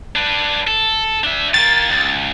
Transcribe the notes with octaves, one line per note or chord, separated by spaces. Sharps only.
D4 B4
A4
D4 E5
D#3 A#3 A6
C#2